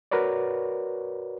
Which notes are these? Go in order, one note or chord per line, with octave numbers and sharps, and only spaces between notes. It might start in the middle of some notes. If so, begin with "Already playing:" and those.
F#4 A#4 B4 C#5 D5